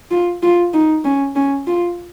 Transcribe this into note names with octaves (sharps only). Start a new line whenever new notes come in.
F4
F4
D#4
C#4
C#4
F4